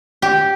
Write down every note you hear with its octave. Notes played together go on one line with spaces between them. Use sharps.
G4